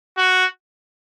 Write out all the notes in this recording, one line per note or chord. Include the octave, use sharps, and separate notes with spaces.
F#4